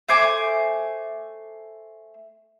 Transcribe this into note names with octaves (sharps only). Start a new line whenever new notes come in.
A3 C5 G#5 D6